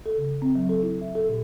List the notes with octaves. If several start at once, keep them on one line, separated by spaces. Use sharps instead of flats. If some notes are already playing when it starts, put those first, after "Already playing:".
A4
C#3
C4
F#3
A4
E4
E5
A4
A#2